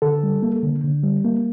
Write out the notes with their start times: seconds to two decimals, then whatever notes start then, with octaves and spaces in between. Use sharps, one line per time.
0.02 D3 A4
0.23 G3
0.43 A#3
0.63 D3
0.84 D3
1.04 G3
1.25 A#3